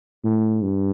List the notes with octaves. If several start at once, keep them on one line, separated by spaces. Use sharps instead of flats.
A2
G2